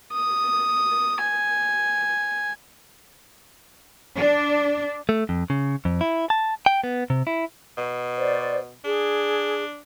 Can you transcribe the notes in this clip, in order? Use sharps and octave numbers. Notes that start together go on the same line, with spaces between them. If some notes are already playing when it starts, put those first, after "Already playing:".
D#6
G#5
D4
A3
F2
C#3
F2
E4
A5
G5
B3
C3
E4
B2
C5 D5
D4 G#4